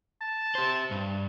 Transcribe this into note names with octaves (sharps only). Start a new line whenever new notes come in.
A5
G4 C5
G2